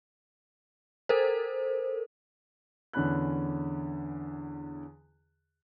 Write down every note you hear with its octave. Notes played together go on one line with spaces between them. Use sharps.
A4 A#4 C5
E2 D3 C#4 B5 F#6